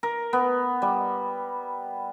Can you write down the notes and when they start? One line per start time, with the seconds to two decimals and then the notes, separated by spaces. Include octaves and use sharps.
0.03 A#4
0.33 B3
0.82 G3